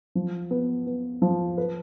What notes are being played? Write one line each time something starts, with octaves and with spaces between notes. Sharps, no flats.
F3
B3
B3
F3
B4